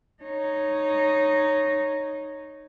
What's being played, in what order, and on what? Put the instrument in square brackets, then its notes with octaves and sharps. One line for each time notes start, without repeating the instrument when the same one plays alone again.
[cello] D#4 C#5